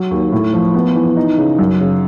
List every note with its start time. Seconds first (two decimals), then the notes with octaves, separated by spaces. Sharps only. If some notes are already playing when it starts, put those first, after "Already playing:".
Already playing: F#3
0.11 D#2
0.32 A2
0.54 F3
0.74 B3
0.95 E3
1.17 D#4
1.38 C#3
1.59 F#2
1.80 C#3